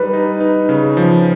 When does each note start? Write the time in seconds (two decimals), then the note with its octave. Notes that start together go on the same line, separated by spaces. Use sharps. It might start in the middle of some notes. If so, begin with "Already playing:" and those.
Already playing: G3 D#4 B4
0.13 D#4
0.40 D#4
0.69 C#3
0.97 F3